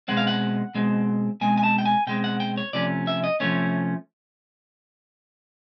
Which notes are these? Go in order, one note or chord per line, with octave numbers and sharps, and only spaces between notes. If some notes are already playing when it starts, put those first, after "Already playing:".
B2 G#3 C4 F#5
F5
F#5
B2 G#3 C4
B2 G#3 C4 G#5
G#5
A5
G5
G#5
B2 G#3 C4 G5
F#5
G5
C#5
C3 F3 A3 C#4 D5
E5
D#5
C3 F3 A3 C#4 C#5